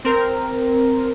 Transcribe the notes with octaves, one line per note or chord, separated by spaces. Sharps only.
C4 A#4